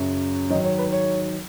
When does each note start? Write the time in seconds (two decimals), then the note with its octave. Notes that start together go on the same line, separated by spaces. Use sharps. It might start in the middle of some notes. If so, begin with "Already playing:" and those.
Already playing: F#2 C#3 F#3
0.50 G#2 D#3 F#3 D#5
0.64 C#5
0.78 B4
0.92 C#5